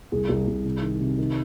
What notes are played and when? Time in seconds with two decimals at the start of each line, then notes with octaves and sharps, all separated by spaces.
0.12 C2 G#4
0.29 C2
0.47 C2
0.65 C3
0.82 D#3
1.00 C3
1.18 D#3